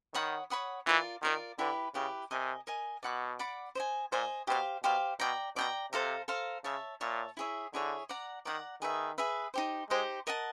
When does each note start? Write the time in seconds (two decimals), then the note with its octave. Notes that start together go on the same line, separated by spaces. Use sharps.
0.14 D#3 C#5 F#5 B5 D#6
0.50 C#5 F#5 B5 D#6
0.86 E3 F4 A#4 D5
1.23 D#3 F4 A#4 D5
1.58 D3 E4 G4 B4
1.94 C#3 E4 G4 B4
2.31 C3 A#4 D#5 G#5
2.67 A#4 D#5 G#5
3.03 B2 D5 F#5 B5 D6
3.39 D5 F#5 B5 D6
3.75 C5 D#5 G#5
4.12 A#2 C5 D#5 G#5
4.47 B2 G4 C5 F5
4.84 B2 G4 C5 F5
5.20 B2 D5 G5 A#5
5.56 B2 D5 G5 A#5
5.92 C3 A4 C5 F5 A#5
6.28 A4 C5 F5 A#5
6.64 C#3 C#5 E5 A5
7.01 A#2 C#5 E5 A5
7.37 E4 G#4 C#5 E5
7.73 D3 E4 G#4 C#5 E5
8.09 D5 F#5 A#5
8.45 D#3 D5 F#5 A#5
8.81 D#3 G#4 B4 E5
9.18 G#4 B4 E5
9.54 D#4 G4 C5
9.90 G#3 D#4 G4 C5
10.27 A#4 D#5 F#5 A5